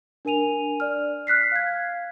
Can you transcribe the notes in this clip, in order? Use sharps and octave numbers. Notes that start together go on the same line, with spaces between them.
D4 A#4 G#5 D#7 F7
D5 F6
F6 F#6 B6 C7
F5 G#6